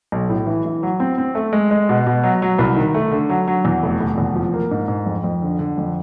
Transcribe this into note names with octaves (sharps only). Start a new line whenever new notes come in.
B1
A2
E3
E3
F#3
C4
C4
A3
G#3
G#3
B2
B2
F#3
F#3
C2
D#3
A3
D3
F#3
F#3
E2
F1
F1
E2
F3
A#3
G#2
G#2
F2
F2
D3
D3
F2